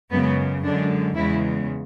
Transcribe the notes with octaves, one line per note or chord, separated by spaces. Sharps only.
F#2 C#3 G#3 B3
F#2 D3 G#3 D4
E2 C#3 G#3 E4